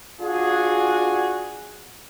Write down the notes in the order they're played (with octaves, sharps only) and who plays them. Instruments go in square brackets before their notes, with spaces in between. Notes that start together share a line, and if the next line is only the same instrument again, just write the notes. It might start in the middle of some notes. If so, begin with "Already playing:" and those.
[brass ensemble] D4 F4 F#4 G#4